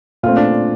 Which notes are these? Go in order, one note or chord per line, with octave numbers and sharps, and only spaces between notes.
A#2 A3 C4 F4
D4